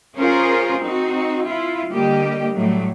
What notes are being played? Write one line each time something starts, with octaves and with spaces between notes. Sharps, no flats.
C#4 F4 G#4 A#4 C5
C4 D#4 F#4
E4 F4
D3 G3 A#3 G4 D#5
A2 F#3 G3 A3